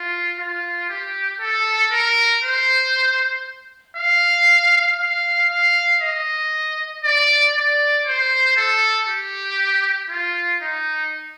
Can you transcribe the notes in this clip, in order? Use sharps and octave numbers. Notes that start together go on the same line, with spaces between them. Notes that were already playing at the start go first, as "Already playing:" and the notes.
Already playing: F4
F4
G4
A4
A#4
C5
F5
F5
F5
D#5
D5
D5
C5
A4
G4
F4
D#4